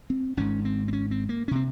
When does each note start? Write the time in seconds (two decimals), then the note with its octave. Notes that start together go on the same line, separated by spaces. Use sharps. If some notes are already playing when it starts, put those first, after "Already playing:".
0.10 C4
0.37 G#1 G#2 C#4
0.65 C4
0.88 C4
0.93 C#4
1.11 C4
1.29 A#3
1.48 C#4
1.51 C3 C4